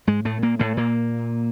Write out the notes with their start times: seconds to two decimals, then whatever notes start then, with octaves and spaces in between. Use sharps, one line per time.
0.07 G#2 G#3
0.25 A2 A3
0.42 A#2 A#3
0.59 A2 A3
0.77 A#2 A#3